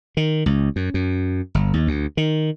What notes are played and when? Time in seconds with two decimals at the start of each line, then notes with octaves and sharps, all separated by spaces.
0.17 D#3
0.46 C#2
0.76 F#2
0.94 F#2
1.55 G1
1.74 D#2
1.87 D2
2.17 D#3